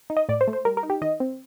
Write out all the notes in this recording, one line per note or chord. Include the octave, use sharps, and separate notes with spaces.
D#4
D#5
A2 D5
C5
A3
C5
G3 A#4
A#4
D#4
G4
D#3 D#5
C4